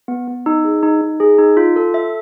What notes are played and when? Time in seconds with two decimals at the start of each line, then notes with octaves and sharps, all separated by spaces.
0.08 B3
0.28 B3
0.46 D#4
0.64 G#4
0.83 D#4
1.01 D#4
1.20 G#4
1.38 D#4
1.57 F4
1.76 A4
1.94 E5